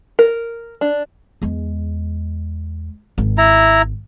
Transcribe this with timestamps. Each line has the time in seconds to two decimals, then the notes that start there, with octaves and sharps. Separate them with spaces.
0.19 A#4
0.81 D4
1.42 E2 G#3
3.18 G#1
3.38 E4 A#5